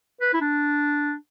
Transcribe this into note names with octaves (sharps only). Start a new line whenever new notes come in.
B4
E4
D4